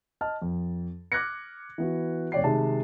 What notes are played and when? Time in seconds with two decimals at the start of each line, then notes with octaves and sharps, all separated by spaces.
0.21 D#5 A5 F6
0.42 F2
1.12 D6 F6 F#6 G#6 A#6 C#7
1.78 E3 B3 F#4
2.32 F1 C#5 D5 G5 C7
2.44 C3 D#3 G#3 A5